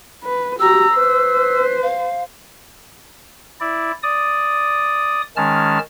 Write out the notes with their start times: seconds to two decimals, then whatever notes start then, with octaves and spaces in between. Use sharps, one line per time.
0.24 B4
0.60 F#4 G4 A#5 E6
0.96 B4 C5
1.83 F5
3.60 E4 D5
4.03 D5 D#6
5.37 D#3 G#3 C#4 A5 F6